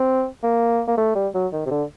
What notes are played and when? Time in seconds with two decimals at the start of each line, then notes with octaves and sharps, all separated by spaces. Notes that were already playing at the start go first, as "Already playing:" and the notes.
Already playing: C4
0.43 A#3
0.88 A#3
0.97 A3
1.15 G3
1.34 F#3
1.52 D#3
1.66 C3
1.71 D3